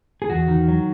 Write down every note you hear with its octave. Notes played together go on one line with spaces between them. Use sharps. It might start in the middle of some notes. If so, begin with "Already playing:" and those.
G#4
E2 F#4
D#3
F#3